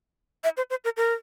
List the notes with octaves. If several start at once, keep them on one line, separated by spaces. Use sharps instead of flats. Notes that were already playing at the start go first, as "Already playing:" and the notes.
E5
C5
C5
A#4
A#4